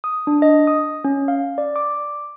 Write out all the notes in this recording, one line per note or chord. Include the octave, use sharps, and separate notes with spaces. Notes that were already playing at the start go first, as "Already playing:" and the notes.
D#6
D4
D#5
D#6
C#4
F5
D5
D6